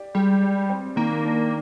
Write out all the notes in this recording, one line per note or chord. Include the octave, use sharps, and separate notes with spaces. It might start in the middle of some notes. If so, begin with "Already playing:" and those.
Already playing: G4 D5
G3 G#3
D5
C4
D#3 A#3
D4